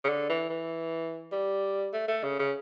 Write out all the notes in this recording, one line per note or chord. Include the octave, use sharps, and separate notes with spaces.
C#3
D3
E3
E3
G3
A3
A3
C#3
C#3